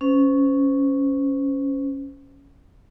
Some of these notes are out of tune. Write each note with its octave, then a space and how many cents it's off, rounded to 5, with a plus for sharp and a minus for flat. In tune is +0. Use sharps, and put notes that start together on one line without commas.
C#4 +0 C5 -35